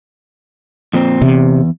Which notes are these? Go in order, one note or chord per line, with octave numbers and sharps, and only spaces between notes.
F2 A#2 C4
E2 C3